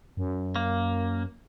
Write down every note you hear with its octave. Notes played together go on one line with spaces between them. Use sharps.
F#2
A#3